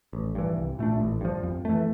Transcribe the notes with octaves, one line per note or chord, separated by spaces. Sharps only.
A1
G2 E3
C2
A#2 A3 D4
A1
G2 F3
F2
E3 A3